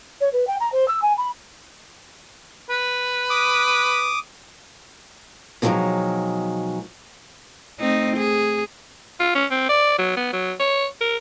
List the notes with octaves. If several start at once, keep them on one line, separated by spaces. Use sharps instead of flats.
C#5
B4
G5
A#5
C5
E6
G#5
B5
B4
D6 D#6
B2 D3 D#3 F3 F#3 G#3
A3 C4 D#4
G#4
F4
C#4
C4
D5
F#3
B3
F#3
C#5
A#4